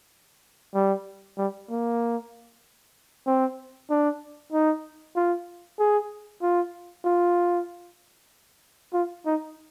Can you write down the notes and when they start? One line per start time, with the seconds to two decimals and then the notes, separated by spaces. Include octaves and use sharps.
0.74 G3
1.37 G3
1.70 A#3
3.27 C4
3.90 D4
4.52 D#4
5.16 F4
5.79 G#4
6.42 F4
7.05 F4
8.93 F4
9.26 D#4